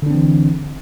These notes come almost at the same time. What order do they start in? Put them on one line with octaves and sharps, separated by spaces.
D3 D4 C4 E3